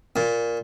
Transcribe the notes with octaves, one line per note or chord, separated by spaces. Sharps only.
A#2